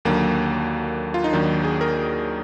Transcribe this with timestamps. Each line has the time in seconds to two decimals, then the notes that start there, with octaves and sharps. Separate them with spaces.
0.05 D#2 D3 F#3 A#3
1.14 F4
1.24 D#4
1.32 D#2 D#3 F#3 D4
1.64 G#4
1.81 A#4